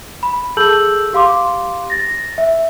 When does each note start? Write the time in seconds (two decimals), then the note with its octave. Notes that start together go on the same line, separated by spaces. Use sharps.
0.23 B5
0.57 G#4 A4 A5 E6 G6 F#7
1.13 G4 F5 C6 D6
1.90 A6 A#6
2.38 E5